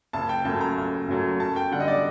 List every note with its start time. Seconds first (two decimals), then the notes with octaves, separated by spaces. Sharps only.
0.13 F#1 A5
0.29 G5
0.45 F#2 F#3 A3 A5
0.61 A#5
0.77 F#1
1.08 F#2 F#3 A3
1.40 F#2 A5
1.56 G5
1.72 D3 G3 F#5
1.80 D#5
1.88 D5